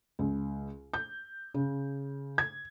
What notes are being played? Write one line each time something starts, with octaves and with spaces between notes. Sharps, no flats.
C#2
G6
C#3
G#6